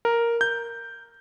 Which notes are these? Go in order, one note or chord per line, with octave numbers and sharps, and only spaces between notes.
A#4
G6